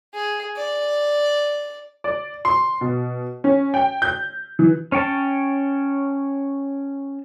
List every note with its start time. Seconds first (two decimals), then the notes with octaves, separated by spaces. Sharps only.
0.14 G#4
0.57 D5
2.04 D5
2.45 C6
2.81 B2
3.44 C#4
3.74 G5
4.02 G6
4.59 E3
4.92 C#4 C#5 G5 A5